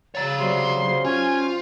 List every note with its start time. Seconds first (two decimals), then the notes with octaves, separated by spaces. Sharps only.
0.15 C#3 C#5 A#5 A6
0.39 C3 F#3 D5 C6
0.83 F#3 D#4 C5
1.05 C#4 F4 G5 G#5